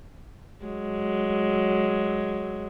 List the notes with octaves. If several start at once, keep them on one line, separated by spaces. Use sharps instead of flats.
F#3 G#3